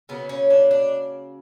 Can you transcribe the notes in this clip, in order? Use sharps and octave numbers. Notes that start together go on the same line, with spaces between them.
C#3 F#3 A#3 B3
C#4
D4
D4